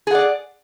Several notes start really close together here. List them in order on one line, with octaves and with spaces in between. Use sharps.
G#4 F#5 D5